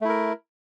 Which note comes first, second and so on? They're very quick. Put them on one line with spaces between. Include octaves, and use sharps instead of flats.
A3 E4 A#4